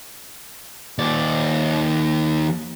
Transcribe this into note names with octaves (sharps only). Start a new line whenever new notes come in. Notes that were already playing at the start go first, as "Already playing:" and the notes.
D#2 D5